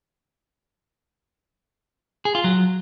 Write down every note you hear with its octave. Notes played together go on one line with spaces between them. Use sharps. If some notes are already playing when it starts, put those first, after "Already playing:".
G#4
F4
F#3